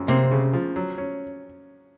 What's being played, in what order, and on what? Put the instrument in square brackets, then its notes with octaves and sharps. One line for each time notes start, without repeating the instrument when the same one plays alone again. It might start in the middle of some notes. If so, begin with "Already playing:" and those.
Already playing: [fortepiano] F#2 C#3 F3
[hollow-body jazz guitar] C3 C4 [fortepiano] A#3
[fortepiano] C#3
F3
F#3
C#4